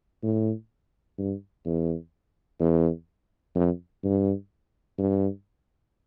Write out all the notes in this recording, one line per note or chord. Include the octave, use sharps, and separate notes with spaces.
A2
G2
E2
E2
F2
G2
G2